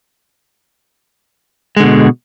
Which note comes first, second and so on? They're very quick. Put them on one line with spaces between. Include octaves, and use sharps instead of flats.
G#3 D3 B2